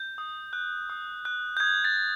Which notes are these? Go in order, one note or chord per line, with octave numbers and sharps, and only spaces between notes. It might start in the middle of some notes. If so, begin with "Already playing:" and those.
Already playing: G6
D#6
F#6
D#6
F#6
G6
D#6 G#6
A6
G6